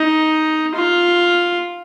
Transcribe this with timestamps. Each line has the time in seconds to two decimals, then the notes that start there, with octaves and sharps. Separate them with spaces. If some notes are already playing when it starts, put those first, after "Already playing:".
Already playing: D#4
0.75 F4